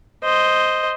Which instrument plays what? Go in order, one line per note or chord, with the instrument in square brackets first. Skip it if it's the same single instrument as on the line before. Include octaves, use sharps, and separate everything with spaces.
[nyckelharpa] C5 D#5